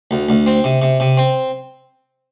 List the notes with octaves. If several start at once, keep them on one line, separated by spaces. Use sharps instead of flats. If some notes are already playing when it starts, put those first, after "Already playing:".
D2
D2
C4
C3
C3
C3
C4